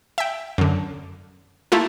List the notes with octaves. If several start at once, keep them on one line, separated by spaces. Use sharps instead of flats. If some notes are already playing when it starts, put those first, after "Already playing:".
E5 G5
F#2 D3
A3 A#3 E4 F4 A4